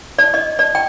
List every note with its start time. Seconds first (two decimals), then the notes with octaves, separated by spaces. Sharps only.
0.19 D5
0.34 D#5
0.59 D5
0.75 G5